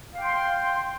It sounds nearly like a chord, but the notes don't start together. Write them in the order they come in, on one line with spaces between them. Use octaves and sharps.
F5 G5 C6